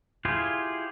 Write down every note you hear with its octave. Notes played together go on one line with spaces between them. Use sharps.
E4 F4 G4 G#4 C5